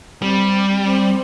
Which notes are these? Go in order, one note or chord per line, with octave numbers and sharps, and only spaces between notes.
G3 C4
C4